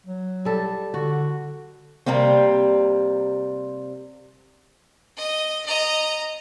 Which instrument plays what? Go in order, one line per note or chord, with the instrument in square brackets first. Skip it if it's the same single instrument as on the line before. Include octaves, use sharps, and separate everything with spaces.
[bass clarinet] F#3
[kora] G3 A4
[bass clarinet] D3 [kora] F#4
[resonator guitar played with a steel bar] C3 G3 A#3 C4
[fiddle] D#5
D#5 A#5